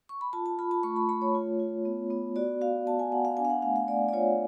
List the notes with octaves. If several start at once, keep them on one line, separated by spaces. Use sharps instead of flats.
C#6
B5
F4 A5
A5
F4 B5
A5
A3 C#6
B5
A3 B5
C#5
F4
F4
B3
B3
F#4 D5
F#4 F5
B3 A5
G#5
B3 F#5
F5
D4 G#5
F5
F#5
A3 F5
F5
A3 D5
D5
F4 C#5